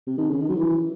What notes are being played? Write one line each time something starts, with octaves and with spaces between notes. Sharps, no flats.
C3
D#3
C#3
D#3
F#3
E3